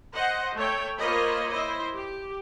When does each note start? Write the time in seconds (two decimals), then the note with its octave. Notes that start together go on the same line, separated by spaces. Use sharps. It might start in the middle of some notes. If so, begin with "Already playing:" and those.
0.13 C5 D#5 F#5
0.55 A3 A4 C#5 G5
0.98 A#3 F4 C5 C#5 D#5 B5
1.51 E4 C5 D#5
1.95 G4